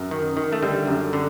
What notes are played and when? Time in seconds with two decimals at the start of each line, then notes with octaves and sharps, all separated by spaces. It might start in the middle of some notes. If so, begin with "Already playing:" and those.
Already playing: F#2
0.11 D#3
0.37 D#3
0.52 A3
0.63 D3 G3
0.87 F#2
1.13 D3